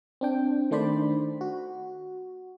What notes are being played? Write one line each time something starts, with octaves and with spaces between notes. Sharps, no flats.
C4 D4 G5
D#3 A3 D4 C5 D5 B5
F#4